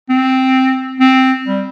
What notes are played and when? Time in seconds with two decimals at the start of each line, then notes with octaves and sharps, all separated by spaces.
0.09 C4
1.00 C4
1.47 G3